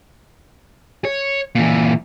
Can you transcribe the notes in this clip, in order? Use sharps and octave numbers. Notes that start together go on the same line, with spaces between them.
C#5
A#2 E3